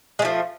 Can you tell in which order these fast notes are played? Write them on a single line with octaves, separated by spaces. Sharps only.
G#3 A3 F3